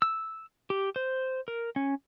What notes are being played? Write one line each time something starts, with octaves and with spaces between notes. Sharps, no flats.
E6
G4
C5
A#4
C#4